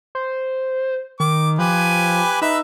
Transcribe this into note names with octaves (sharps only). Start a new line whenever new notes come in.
C5
D#3 D6
F3 G4 B4 G#5
D#4 B4 E5 E6